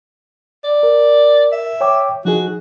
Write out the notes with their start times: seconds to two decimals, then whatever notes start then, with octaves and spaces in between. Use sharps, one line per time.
0.64 D5
0.83 A#4
1.52 E5
1.81 C#5 G5 D6
2.25 F3 D#4 F#4 G#4